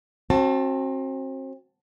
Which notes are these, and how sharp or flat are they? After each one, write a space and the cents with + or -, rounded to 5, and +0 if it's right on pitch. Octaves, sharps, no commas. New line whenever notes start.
C4 +35 F#4 +0 A5 +10